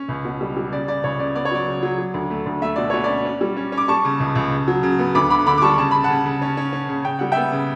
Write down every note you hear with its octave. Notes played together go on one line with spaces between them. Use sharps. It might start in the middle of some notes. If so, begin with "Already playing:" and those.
Already playing: C#4
C#2
B2
G3
G3
C#3 D5
C#3 D5
C#2 C#5
C#3 D5
B3 D5
C#5
F#3 D5
C#3
F#3
F#3
D2
A3
D2
A3 E5
B2 D5
B2 C#5
D5
C#4
C#4
G3
C#4
C#4
D6
G3 A5 C#6
C#3
C#2
C#2
C#3
F#3
C#3
B3
D2 B5 D6
D3 B5 D6
D3 B5 D6
D6
G3 A5 C#6
C#3 A5
C#3 B5
F#5 A5
C#3
C#3
C#4
C#4
C#4
C#3
C#3 G5
G3 F#5
B3 E5 G5
C#3